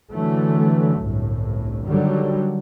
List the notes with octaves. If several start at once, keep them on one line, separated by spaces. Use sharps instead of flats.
D3 E3 F#3 A3
G1 C2 A2
D3 D#3 F#3 G3